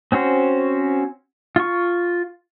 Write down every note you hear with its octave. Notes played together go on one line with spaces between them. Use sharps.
C4 C#4 F#4 C5
F4 C#6